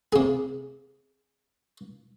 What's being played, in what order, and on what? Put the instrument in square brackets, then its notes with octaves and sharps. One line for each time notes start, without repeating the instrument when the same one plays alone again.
[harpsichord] C3 G#4